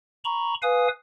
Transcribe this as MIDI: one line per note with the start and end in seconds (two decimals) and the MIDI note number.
0.25 0.54 82
0.25 0.54 83
0.25 0.54 85
0.62 0.88 71
0.62 0.88 77
0.62 0.88 80
0.62 0.88 87